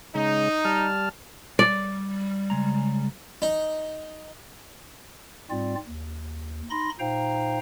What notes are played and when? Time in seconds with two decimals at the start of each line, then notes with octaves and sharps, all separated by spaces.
0.15 C#3 G#3 D#4
0.65 G3 A5 F6
1.59 G3 D5
2.50 C#3 G#3 A#5
3.42 D#4
5.50 G#2 G3 C4 F4 D5
5.87 D#2
6.70 D#4 B5 C6 A#6
6.99 A#2 D#4 C5 F5 G5 A#5